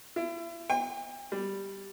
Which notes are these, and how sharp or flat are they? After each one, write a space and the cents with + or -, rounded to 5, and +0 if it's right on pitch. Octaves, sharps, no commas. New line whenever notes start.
E4 +35
G5 +45
G3 +0